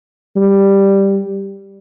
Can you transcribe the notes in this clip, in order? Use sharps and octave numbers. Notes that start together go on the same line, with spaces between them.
G3